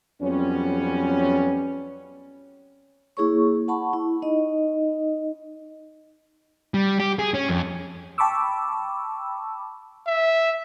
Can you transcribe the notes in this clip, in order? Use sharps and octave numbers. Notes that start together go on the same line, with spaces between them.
F2 F#3 G3 B3 C#4
A#3 E4 G#4 C#5 C#6
F#5 A5 B5 C#6
E4
D#4 D#5
G3
G4
G#4
C#4
F2
G5 A5 B5 C#6 D6 E6
E5